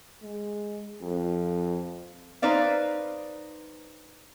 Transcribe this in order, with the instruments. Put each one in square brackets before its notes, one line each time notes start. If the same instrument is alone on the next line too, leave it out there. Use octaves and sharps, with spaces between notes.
[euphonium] G#3
F2
[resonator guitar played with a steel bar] D#4 B4 C5 D5 F5